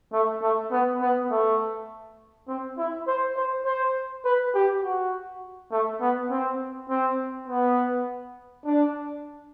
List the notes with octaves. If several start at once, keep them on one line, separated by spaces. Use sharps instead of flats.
A3
A3
B3
B3
A3
C4
E4
C5
C5
C5
B4
G4
F#4
A3
B3
C4
C4
B3
D4